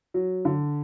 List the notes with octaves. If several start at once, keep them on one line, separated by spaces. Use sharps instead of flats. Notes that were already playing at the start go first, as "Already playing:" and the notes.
F#3
D3